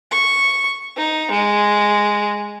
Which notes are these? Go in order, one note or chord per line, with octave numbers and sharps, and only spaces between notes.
C#6
D#4
G#3